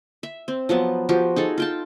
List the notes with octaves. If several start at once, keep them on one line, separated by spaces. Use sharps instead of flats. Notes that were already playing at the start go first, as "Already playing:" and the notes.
E5
C4
F3 F#3 B3 A5
F3 F#4 G4
D#4 G#4 A4
F4 G5 A5